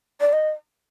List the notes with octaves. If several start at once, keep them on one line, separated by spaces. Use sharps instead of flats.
D5
D#5